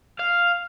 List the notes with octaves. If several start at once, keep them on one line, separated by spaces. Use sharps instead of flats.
F5